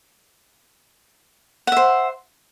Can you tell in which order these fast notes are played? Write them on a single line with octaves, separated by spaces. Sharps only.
F#5 E5 C5